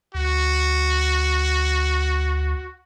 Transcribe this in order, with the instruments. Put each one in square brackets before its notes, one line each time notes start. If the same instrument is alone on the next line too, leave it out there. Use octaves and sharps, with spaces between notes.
[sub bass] D2 [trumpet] F#4